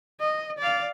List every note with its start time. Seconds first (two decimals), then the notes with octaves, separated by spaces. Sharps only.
0.20 D#5
0.58 D5 F5